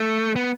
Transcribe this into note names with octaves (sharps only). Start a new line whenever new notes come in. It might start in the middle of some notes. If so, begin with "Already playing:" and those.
Already playing: A3
B3